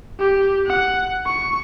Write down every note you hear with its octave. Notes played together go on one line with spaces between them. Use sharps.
G4
F#5
C#6